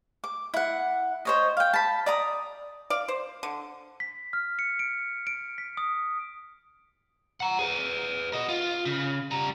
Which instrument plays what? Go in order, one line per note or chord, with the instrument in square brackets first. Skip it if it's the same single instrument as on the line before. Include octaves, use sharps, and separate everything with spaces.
[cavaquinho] D6
E4 F#5
C5 C#5 D#5
F5 G5
A5 B5
D5 A#5 D#6
[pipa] D5 F5
C5
D3
[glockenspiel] B6
F6
C#7
D7
D7
B6
D#6
[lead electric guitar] F#5 A#5
G#4 B4
F#4 D#5
F4
C#3
G3 A#5